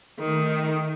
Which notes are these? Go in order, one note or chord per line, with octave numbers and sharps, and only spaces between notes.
D#3 A3